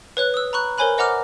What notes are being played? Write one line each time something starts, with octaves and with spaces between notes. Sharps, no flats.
B4 C#5 F#6
D#6 E6
A#5 B5 C#6 F#6
A#4 C5 C#5 G#5 B5 F#6
C5 D#5 F#5 A#5 D6 F6